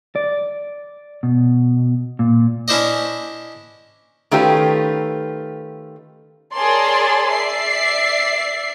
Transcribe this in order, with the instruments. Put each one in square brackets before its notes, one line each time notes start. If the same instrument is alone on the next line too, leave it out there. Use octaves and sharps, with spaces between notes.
[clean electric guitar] D5
B2
A#2
[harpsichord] C#4 D4 E4 C5 D5 D#5
[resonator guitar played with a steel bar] D#3 A3 C#4 F4 G4 B4
[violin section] G#4 A#4 C#5 D5 A5 C6
D5 E5 C7